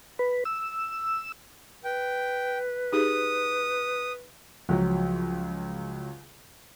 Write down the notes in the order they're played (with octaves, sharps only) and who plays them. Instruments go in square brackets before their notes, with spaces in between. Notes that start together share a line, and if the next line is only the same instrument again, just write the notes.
[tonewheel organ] B4
E6
[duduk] B4 [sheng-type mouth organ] G5
[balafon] D#4 G4 G#4 [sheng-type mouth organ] D#6
[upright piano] C#2 F#3 [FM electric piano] F3